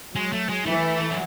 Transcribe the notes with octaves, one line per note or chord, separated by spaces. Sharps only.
F#3 G#3
A3
G#3
E3 A3
F#3